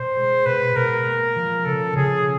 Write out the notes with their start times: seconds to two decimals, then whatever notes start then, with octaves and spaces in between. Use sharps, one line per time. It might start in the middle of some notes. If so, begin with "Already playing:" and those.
Already playing: B2 B3 C5
0.16 G#3
0.45 B2 B4
0.76 B2 A#4
1.06 A#3
1.36 F3
1.65 C#3 A4
1.95 C#3 G#4